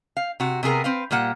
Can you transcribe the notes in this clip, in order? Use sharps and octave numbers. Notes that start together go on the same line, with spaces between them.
F5
C3 F#4
C3 B3 G#4 A#4
C4 B4 F5
A#2 G3 A#3 F#5